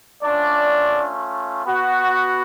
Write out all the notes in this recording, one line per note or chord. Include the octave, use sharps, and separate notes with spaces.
A3 C#4 D4 F4 D5
B3 F#4